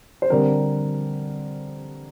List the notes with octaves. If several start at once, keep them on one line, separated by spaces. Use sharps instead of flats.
C5
D3 G3 C4 A#4